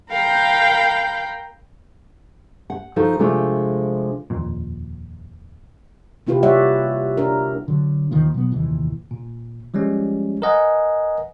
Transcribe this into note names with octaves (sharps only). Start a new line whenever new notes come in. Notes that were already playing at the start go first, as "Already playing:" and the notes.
A#4 F5 G5 B5 G6
F#5
F3 D#4 F#4 A4
C3 F3 G#3 A3 D4 F4
D#1 F2 A#2
C3 A#3 E4 F4 G4 B4
G3 F#4 C#5 D5 E5 F#5
D4 A#4
D3 F#3
D#2 D#3 F3 A#3
B2 F#3 B3
F1 D#2 A#2 E3
A#2
F3 G3 G#3 C#4
A#4 B4 D#5 F#5 G#5